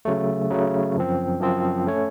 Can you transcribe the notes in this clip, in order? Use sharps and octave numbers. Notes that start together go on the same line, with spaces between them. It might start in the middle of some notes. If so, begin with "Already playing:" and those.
C#3 F#3 A3
C#3 F#3 A3
F#2 F3 C4
F#2 F3 C4
A3 C#4 A4 C#5